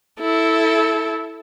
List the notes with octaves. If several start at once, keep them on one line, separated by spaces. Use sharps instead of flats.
E4 A4